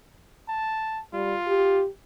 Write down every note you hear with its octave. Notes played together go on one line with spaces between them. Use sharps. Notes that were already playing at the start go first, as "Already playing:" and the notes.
A5
G3 F4
G4